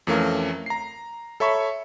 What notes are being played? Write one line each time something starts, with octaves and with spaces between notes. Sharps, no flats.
F2 E3 A3 C#4 A#4 F5
A#5 C7
A4 C#5 E5 B5 C#6